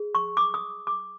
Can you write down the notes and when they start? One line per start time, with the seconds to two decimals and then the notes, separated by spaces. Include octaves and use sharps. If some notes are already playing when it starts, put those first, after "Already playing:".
Already playing: G#4
0.15 C#6
0.37 D6
0.54 D#6
0.87 D6